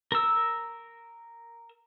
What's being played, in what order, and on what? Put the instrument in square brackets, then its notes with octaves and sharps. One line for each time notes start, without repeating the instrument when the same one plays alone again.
[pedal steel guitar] A#4 E6